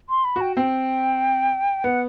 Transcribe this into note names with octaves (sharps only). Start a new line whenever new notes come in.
C6
B5
F#4
G5
C4 G5
B3 F#5